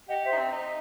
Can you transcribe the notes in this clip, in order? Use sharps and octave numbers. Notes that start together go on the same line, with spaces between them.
G4 D#5 F#5
C5 E5
D#4
C4
D#4